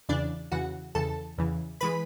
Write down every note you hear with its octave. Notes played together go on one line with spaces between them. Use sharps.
E2 C#3 E3 D4 D5
E2 C#3 E3 F#4 F#5
E2 C#3 E3 A4 A5
E2 C#3 E3
E3 G#3 B4 B5